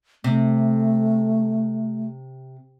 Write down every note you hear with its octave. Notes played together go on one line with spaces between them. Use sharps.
C3 A3